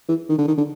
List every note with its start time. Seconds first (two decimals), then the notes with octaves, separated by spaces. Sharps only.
0.09 E3
0.29 D#3
0.38 D3
0.48 D#3
0.58 D3